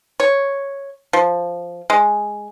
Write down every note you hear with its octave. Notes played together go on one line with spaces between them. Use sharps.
C#5
F3
G#3